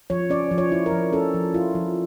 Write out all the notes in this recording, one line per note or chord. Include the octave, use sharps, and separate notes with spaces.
F3 C#5
C#4 D5
F3
C#5
E4
A#4
F3
C#4 A4
F3
E4 F4
F3